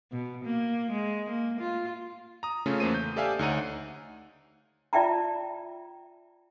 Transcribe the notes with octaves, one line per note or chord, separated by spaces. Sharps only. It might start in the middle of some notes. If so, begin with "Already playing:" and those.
B2
A#3
G#3
A#3
F4
A#5 D#6
C#3 A3 C#4 F4
E2 A3 A#3 C5 D#7
G6
G4 A4 D5 E5 F5 G#5
D2 D#4 C#5 F#5 A#5 D#7
F4 D5 E5 G5 A5 A#5